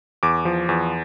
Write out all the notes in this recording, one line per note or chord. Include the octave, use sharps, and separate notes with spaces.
E2 D6
F3
E2